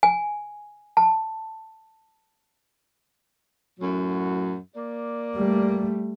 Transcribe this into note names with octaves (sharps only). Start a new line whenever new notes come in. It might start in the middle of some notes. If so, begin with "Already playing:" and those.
G#5
A5
F#2 A2 F#3
A#3 D5
G3 A3